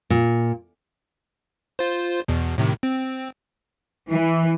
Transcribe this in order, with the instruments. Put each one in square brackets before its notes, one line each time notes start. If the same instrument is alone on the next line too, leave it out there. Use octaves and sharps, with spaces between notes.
[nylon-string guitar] A#2
[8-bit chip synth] F4 C5
E2 B2
A2 C3 D#3
C4
[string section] E3